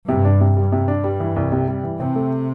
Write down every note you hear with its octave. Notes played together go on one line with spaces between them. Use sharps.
G2 C3
D4
C3
G2 G3
C3
D4
G3
E3
C2
C3
G3
E3
C3 C4
A3